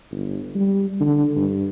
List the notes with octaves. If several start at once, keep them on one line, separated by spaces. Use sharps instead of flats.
G1
G3
D3
G2